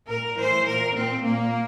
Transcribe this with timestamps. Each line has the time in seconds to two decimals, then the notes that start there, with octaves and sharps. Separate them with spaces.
0.08 A#2 A#4
0.38 A2 E3 C5
0.66 A#2 A#4
0.94 A#2 C4
1.22 A#2 A#3